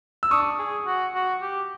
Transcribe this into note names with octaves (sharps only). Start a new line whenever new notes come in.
E6
D4 C#6 D#6
G#4
F#4
F#4
G4